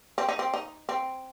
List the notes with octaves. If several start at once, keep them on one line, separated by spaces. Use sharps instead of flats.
C4
D#4
C4
D#4
C4